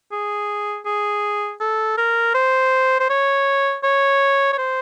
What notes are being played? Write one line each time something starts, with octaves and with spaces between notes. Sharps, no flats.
G#4
G#4
A4
A#4
C5
C5
C#5
C#5
C#5
C5